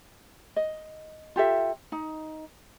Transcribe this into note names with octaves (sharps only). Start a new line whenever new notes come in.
D#5
F4 G4 A4 E5
D#4